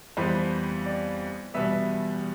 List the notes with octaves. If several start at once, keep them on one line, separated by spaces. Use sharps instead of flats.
F2 E3 G3 B3 C5
D5
E2 B2 G3 B3 E5